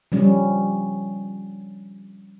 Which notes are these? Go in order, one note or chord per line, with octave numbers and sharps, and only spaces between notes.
F3 G3 C#4